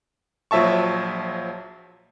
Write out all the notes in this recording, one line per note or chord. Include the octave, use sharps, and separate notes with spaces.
A#1 F3 F#3 E5 A5 C#6